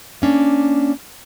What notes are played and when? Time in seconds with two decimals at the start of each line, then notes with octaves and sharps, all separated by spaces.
0.22 A#3 C#4 D4